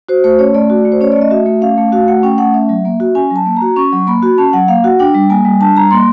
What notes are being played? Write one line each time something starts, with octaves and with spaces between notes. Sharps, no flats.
F#4 C5
A3 C5
C#4 C#5
A3 D5
F#4
A3
C5
C#4 C#5
A3 D5
D#5
F#4 E5
A3
C#4 F5
A3
F#4 F5
A3 F#5
C#4 G5
A3 F#5
C#4 E5
F#3
A#3
F#4
C#4 G#5
F#3 A5
A#3
A#5
F#4
C#4 C#6
F#3
A#3 B5
F#4
C#4 A5
F#3 F#5
A#3 F5
F#4 F#5
D4 G5
G3
A#3 G#5
G3
D4 A5
G3 A#5
A#3 C6